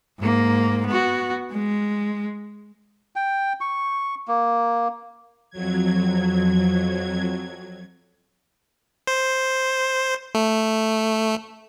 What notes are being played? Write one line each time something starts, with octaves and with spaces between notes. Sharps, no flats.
G#2 A#3
B3 F#4
G#3
G5
C#6
A#3
F2 F#3 G#6
C5
A3